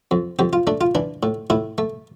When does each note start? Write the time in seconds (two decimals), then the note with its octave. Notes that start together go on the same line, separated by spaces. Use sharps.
0.11 F2
0.39 F2 G4
0.53 F4
0.67 A3 D4
0.81 F4
0.95 E3 D4
1.23 A2
1.50 A2 E4
1.78 A3